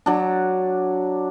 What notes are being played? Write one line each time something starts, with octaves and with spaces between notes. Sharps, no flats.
F#3 D4